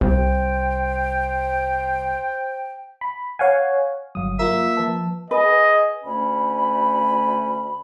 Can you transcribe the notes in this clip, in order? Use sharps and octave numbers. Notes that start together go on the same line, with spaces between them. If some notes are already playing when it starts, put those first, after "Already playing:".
C2 C5 G5
B5
C#5 F5 F#5 G#5
G1 F#3 F5 D#6
A#3 F4 A#4 E5
F3 B4 A5
G#4 B4 D#5
D2 A3 C#4 B5